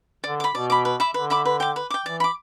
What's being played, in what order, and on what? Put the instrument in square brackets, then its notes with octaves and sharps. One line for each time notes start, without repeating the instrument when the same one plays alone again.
[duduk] D3 [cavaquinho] D5
[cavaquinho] B5 D6
[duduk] B2 [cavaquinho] D5
[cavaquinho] B5 D6
B4
E5 B5 D6
[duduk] D3 [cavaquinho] B4
[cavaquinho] E5 B5 D6
B4
G5 D6
B4
G5 D6
[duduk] E3 [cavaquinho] D5
[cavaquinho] B5 D6